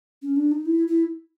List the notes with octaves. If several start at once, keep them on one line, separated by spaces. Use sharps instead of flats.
C#4
D4
D#4
E4
E4